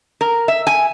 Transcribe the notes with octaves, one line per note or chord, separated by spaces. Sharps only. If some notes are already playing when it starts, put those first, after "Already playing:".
A#4
E5
G#5